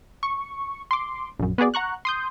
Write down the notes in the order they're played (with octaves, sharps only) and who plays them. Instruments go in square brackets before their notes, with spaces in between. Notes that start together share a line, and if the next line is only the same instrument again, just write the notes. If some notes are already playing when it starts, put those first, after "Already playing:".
[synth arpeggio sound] C#6
C6 D6
A#1 F#2
B3 F#4 G#4 D5
F#5 A#5 C#6 F#6
C6 D#6 G6